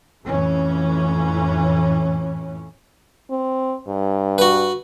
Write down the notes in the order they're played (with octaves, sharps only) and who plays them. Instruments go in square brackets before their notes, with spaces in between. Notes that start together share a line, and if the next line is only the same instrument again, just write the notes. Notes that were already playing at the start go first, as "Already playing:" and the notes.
[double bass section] F2 A2 E3 C#4
[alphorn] C4
G2
[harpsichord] F#4 B4